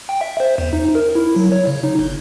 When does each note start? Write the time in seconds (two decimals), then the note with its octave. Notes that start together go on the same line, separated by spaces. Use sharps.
0.09 G5
0.21 E5
0.40 C5
0.58 E2
0.73 D#4
0.95 A#4
1.15 E4
1.36 F#3
1.52 C#5
1.67 C#3
1.83 D#4
1.99 G1